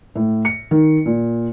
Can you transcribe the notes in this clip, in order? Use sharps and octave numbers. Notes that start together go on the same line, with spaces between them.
A2
C#7
D#3
A#2